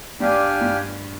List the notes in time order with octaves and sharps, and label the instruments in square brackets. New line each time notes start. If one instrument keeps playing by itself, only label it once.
[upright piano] G2 [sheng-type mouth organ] D4 G4 D5 F5 G#5
[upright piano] G2